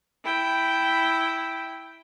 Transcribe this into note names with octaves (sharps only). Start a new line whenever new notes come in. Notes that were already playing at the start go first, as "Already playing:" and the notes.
E4 G5